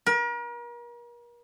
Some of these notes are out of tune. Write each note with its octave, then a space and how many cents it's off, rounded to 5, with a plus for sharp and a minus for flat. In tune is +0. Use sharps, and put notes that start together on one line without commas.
A#4 +40